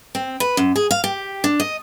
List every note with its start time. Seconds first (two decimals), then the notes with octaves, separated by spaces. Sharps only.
0.15 C4
0.40 B4
0.57 F#2
0.76 G#4
0.91 F5
1.04 G4
1.44 D4
1.60 D#5